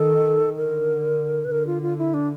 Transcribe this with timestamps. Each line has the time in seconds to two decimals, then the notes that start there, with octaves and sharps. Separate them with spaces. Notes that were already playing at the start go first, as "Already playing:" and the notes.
Already playing: D#3 A4
0.56 D3 A#4
1.44 B4
1.51 D3 A#4
1.67 F4
1.82 F4
1.98 E4
2.14 D4